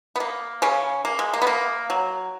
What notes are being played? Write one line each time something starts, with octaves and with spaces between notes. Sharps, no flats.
B3
A#3
C#3 C#4
A#3
G#3
A#3
B3
A#3
F#3